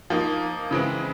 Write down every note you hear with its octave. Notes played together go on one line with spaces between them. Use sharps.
F3 A#3 D#4
C#3 E3 G#3 C4 E4